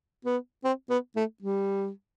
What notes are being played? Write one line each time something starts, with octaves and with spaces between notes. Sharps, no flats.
B3
C4
B3
A3
G3